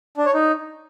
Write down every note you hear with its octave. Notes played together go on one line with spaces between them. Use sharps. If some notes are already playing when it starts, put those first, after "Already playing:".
D4
C#5
D#4